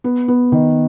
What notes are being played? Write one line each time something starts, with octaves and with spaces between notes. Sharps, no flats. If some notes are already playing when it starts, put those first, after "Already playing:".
B3
B3
D#3